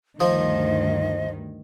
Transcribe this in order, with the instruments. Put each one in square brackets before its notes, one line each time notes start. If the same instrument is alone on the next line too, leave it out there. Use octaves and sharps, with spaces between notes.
[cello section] D2 G2 D#3 [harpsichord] F3 [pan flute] D#5